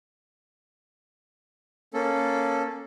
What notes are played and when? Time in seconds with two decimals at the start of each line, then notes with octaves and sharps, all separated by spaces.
1.94 A#3 C#4 A4